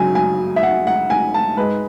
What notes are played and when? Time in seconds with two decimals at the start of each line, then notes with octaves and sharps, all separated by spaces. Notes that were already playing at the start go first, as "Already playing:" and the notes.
Already playing: F#2 C#3 F#3 G#5
0.15 G#5
0.56 E5
0.63 F#5
0.87 F#5
1.10 G#5
1.34 A5
1.57 G#2 G#3 B4